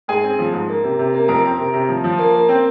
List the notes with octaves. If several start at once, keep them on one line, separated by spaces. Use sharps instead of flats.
G#2 G#4 G#5
C4
F3
G#2
A#3
C3
C3
A#3
F2 A#4 A#5
C4
C3
C3
F3
F3
A#3
A#3
C4